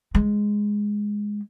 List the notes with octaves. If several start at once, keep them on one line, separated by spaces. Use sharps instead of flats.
G#3